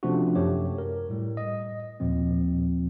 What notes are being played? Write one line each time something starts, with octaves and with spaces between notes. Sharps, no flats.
C3 F3 A3 C#4 D4 F#4
F#2 A3 G4 C#5
A#4
A2 G3
D#5
D#2 A#2 F3 C4